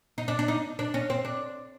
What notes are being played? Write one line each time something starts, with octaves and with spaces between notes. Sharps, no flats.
D#4
D4
D4
D#4
D4
C#4
C4
D4